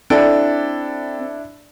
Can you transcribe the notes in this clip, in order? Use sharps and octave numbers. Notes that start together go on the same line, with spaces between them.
C4 D4 E4 A4 D5